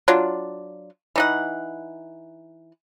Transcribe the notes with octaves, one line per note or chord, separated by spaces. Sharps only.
F#3 D4 F4
E3 D#4 F#5